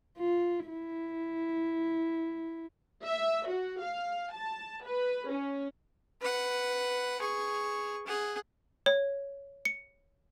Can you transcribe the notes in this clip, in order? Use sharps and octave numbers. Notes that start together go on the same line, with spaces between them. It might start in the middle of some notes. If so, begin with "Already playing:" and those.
F4
E4
E5
F#4
F5
A5
B4
C#4
B4 F#5
G#4 C#6
G#4 F#5
C#5
C#7